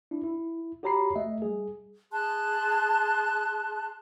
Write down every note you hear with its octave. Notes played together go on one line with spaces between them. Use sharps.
D4 E4
E4
F#4 G4 C#5 A#5 B5 C7
A3 D#5 E5
G3 G#4
G#4 A5 C6 F#6